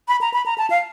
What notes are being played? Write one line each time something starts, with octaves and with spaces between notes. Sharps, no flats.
B5
A#5
B5
A#5
A5
F5